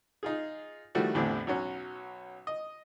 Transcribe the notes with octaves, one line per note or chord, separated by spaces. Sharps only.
D#4 F4 G#4
D#3 F3 G3 A3 E4 F#4
A1 E2 A2 D3 C4
B1 F#3 C#4
D#5